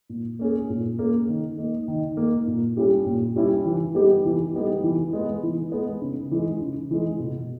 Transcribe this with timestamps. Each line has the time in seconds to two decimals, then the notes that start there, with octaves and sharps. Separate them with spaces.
0.09 A#2
0.39 A#3 C#4 G#4
0.70 A#2
0.99 A#3 C#4 G#4
1.28 D#3
1.58 A#3 D#4
1.88 D#3
2.17 A#3 D#4
2.47 A#2
2.77 G3 C#4 E4 G4
3.06 A#2
3.36 G3 C#4 E4 G4
3.66 E3
3.95 G3 B3 D#4 G4
4.25 E3
4.54 G3 B3 D#4 G4
4.84 E3
5.13 G#3 B3
5.43 E3
5.72 G#3 B3
6.02 C#3
6.31 E3 G#3
6.61 C#3
6.91 E3 G#3
7.20 B2